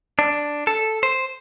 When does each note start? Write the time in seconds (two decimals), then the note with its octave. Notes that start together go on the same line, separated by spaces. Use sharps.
0.19 D4
0.67 A4
1.03 C5